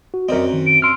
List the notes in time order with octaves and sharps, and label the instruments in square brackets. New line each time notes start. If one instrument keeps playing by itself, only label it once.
[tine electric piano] F#4
[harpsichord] F#2 C4 [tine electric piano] A#4 D5 D#5
[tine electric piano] D#3
[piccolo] D7
[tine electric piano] C6 E6 F6 [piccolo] D7